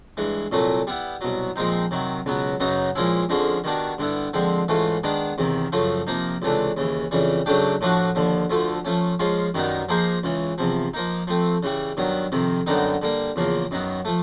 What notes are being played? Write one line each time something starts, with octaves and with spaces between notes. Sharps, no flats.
G2 E3 G#3
C2 A#2 F#3 A3
G3 B3 E4
C2 B2 F#3
A#2 F3 G#3 C4 D#4
C3 D#3 F#3
C#2 B2 F#3 B3
F#2 C#3 F#3 B3 D#4
A#2 F3 G#3 C#4 E4
F2 D3 F3 G#3 C#4
D#3 G3 B3 D4 F#4
G2 D3 G3 B3 E4
D3 F3 G#3 C4
G#2 E3 A3 C#4 F4
D#3 G#3 B3 D4
E2 C3 D#3
F#2 C#3 F3 A3
C3 F3 A#3 D#4
C#2 C3 E3 A3 D4
D#2 C#3 E3
F2 C#3 E3 G3
C#3 F#3 A3 D4 G4
A2 F3 A3 D4 F#4
D#2 D3 F3
D2 D3 F3 A3
F3 A3 C#4
F3 G#3 C#4 F4
F#2 D#3 G3 B3 D#4
F3 A#3 D#4 G#4 C5
C#2 C#3 E3
E2 C3 F3
F3 A#3 D#4
F3 A3 C4
C#3 E3 G3
G2 D#3 F#3 B3
F2 C3 D#3
F#2 D3 G3 B3 D#4
D3 G3 A#3
E2 C#3 F3 A#3
F#2 D#3 F#3 B3
F3 A3